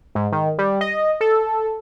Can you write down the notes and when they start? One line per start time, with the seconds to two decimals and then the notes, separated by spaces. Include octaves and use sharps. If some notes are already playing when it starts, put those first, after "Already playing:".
0.15 G#2
0.32 D#3
0.58 G3
0.81 D#5
1.21 A4